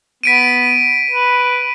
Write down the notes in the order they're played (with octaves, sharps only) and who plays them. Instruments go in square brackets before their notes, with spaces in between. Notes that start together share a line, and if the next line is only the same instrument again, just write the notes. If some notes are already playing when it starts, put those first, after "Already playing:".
[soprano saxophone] B3 [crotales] B6 D7 D#7
[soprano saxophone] B4